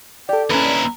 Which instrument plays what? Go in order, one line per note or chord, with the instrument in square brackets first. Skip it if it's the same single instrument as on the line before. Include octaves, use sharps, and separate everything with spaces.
[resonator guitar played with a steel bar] G4 [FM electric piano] A4 D5 [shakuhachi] G5
[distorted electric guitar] D#2 E4 [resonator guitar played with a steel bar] C#4 B4 [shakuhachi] A#5